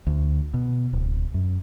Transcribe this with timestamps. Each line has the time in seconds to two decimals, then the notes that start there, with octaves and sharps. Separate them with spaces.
0.07 D2
0.54 B2
0.93 D1
1.34 F#2